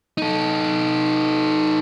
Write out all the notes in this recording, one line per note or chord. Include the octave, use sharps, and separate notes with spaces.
D#4 A4